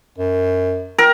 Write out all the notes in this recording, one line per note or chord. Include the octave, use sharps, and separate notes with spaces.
F#2
A#4